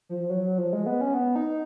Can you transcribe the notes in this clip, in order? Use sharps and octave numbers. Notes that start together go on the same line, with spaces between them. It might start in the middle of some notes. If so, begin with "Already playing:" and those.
F3
F3
F#3
F#3
F3
G#3
B3
C#4
B3
D#4